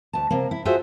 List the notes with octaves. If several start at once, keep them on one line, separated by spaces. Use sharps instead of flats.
D2 A5
C3 A#3
E4
F4 F#4 G#4 C5 E5